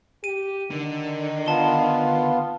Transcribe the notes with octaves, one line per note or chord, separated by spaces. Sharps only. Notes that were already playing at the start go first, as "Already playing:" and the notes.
G4 D#7
D3 D#3
B3 F4 A5 G7